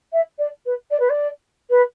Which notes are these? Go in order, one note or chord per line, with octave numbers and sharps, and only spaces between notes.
E5
D5
B4
D5
B4
D5
B4